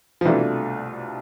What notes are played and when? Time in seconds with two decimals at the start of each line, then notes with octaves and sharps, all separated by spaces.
0.21 F3
0.25 C2 B2 E3 A3 D4 F4